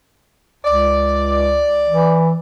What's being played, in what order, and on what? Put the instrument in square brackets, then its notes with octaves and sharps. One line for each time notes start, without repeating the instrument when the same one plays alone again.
[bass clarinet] C#2 [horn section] D5
[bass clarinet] E3